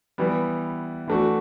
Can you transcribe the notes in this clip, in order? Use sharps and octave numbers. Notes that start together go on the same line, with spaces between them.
E3 G3 B3
E3 A3 D4 F#4